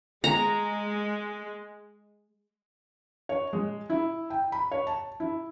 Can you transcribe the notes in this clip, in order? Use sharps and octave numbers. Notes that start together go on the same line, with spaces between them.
G#3 A#5
C#5
G#3
E4
G5
B5
C#5
A5
E4